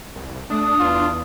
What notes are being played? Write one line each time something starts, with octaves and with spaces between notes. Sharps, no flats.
C2
A3 D4 D#6
E2 F4